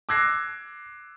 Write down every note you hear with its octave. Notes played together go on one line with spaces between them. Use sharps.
D6 E6 F#6 G#6 A#6 C7